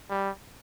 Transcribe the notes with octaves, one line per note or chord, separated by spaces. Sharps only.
G3